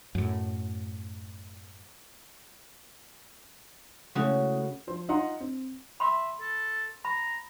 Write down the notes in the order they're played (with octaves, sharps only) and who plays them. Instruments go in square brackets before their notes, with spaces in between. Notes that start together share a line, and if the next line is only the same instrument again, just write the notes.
[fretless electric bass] F#2 A2
[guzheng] C#3 F#4 [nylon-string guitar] G#3 A3 E4
[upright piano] F3 C5
D#4 F4 D#5 F#5 A#5 C6
C4
[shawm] E5 [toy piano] B5 C6
[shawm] A4
[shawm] A#5 [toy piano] B5